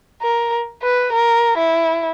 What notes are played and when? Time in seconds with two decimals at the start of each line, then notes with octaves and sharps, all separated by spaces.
0.22 A#4
0.82 B4
1.12 A#4
1.58 E4